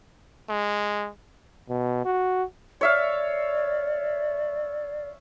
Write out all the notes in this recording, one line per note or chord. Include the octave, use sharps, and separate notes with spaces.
G#3
B2
F#4
C#5 D5 E5 F5